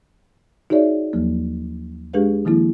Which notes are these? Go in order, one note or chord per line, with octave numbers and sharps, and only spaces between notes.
D#4 F#4 G#4 C#5 D5 E5
D#2 F3 F#3 A#3
G#3 D4 G4 G#4 B4 F5
D#3 F3 A#3 E4